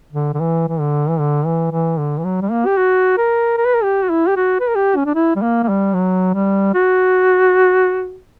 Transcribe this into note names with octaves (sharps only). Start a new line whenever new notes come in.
D3
D3
E3
E3
D3
E3
D3
E3
E3
D3
E3
F#3
G3
A#3
G4
F#4
A#4
A#4
B4
A#4
G4
F#4
E4
G4
F#4
B4
A#4
G4
C#4
D4
E4
G3
A#3
A#3
G3
F#3
G3
F#4